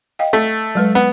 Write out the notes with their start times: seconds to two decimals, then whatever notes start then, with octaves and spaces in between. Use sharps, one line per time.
0.19 D#5 F5 G5
0.33 A3
0.75 F#3 G#3 B4
0.95 B3